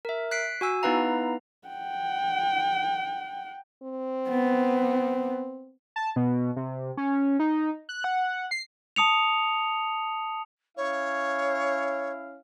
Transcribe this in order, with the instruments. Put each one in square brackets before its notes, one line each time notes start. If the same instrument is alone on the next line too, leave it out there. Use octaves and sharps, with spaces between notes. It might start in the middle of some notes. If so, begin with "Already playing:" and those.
[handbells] A#4 E5
F#6 B6 C7 D7
F#4 G#5 E6
B3 D#4 E4 B4 F5 A#5
[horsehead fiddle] F#5 G5
[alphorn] C4
[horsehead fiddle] B3
[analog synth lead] A5
B2
C3
C#4
D#4
F#6
F#5
C7
[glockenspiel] A5 D#6 C#7 F7
[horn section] C#4 E4 F5 [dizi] C#5